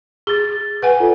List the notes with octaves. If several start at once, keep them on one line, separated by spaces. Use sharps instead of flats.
G#4 A6 G7
B4 F#5 G#5
F4 A4 D5